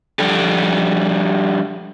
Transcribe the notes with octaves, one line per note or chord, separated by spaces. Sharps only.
F3 G3 D4 G4 A4